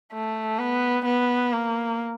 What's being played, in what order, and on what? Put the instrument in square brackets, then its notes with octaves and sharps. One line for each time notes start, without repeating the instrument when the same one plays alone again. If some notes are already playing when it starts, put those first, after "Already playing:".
[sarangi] A3
B3
B3
A#3